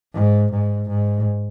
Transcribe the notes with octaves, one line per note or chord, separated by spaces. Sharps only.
G#2
G#2
G#2